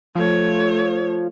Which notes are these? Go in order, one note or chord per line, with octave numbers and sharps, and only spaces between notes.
F3 A3 C#5